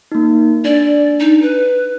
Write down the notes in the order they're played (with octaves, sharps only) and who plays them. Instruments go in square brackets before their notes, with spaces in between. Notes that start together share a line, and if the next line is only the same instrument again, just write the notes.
[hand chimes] A#3 D#4
[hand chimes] D4 [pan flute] D5
[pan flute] D#4
B4